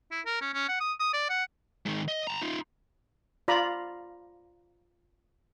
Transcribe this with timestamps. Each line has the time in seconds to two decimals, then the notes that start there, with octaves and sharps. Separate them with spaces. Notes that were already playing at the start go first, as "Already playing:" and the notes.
0.12 E4
0.26 A#4
0.42 C#4
0.54 C#4
0.69 F#5
0.80 D#6
1.00 D#6
1.13 D5
1.30 F#5
1.86 G#2 D#3
2.08 D#5
2.27 A5 A#5
2.42 D#4 F4
3.48 F4 D5 A#5 B5